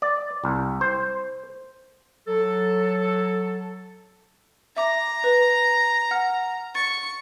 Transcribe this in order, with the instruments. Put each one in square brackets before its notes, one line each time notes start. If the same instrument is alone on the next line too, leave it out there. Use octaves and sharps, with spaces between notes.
[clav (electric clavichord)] D5
C2
C5
[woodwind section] F#3 A4
[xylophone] E5 D6 [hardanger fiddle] A#5
[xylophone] B4
F#5 F6
[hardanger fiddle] C#6 [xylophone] A6